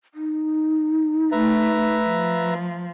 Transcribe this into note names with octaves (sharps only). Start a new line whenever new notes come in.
D#4
A3 B4 E5 A#5
F3